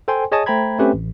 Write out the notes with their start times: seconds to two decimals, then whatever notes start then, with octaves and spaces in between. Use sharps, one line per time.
0.08 A4 C5 G5 G#5 C6
0.32 G#4 C#5 D#5 G#5 A5 D#6
0.46 A3 C5 G5 A#5 B5 G#6
0.79 A3 C4 C#4 G4 B4
0.94 A1